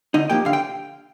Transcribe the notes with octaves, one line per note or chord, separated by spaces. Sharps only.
D3 D#4 D#5
F3 A#3 G4 G5
D3 F5
G5